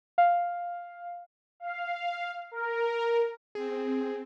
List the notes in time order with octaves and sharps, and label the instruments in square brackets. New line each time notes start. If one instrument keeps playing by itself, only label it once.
[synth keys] F5
[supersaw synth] F5
A#4
[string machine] C4 [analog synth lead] G#4